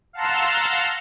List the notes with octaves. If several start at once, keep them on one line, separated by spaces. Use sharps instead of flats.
F5 F#5 A5 A#5 C6 E6